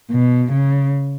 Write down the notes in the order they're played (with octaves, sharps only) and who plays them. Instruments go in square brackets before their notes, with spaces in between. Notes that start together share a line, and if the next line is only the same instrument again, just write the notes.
[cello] B2
C#3